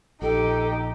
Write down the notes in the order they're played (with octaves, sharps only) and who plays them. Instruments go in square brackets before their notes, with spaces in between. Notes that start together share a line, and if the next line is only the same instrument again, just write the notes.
[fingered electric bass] A#1 [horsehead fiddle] D#4 G4 [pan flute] A4